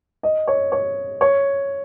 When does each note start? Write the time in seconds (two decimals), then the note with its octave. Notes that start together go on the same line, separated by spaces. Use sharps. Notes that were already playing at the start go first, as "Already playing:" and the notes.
0.23 D#5
0.47 C#5
0.72 C#5
1.21 C#5